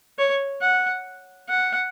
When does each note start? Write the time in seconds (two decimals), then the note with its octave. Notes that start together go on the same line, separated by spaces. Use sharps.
0.18 C#5
0.62 F#5
1.49 F#5